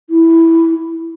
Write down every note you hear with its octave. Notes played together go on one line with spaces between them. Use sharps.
E4